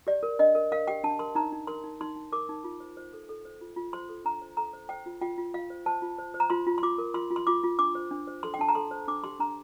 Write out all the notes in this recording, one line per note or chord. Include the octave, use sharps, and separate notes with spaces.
G4 D5
A#4
D4 D#5
A#4
A#4 F5
G4 G5
D4 A5
A#4 C6
D#4 A#5
D#4
A#4 C6
D#4
D#4 C6
D#4
A#4 D6
D#4
F4
C5
C5
A4
A4
C5
F4
F4
C5 C6
A4
D4 A#5
C5
A4 A#5
C5
C5 G5
F4
F4 G5
F4
F4 F5
C5
C5 A5
F4
C5
C5
A#5
F4 C6
F4
C6
F4 D6
A#4
F4 C6
F4
C6
F4 D6
F4
D4 D6
C5
D4
C5
A4 C6
G5
D4 A5
A#5
A4 C6
C5
D4 D6
G4 C6
D4 A#5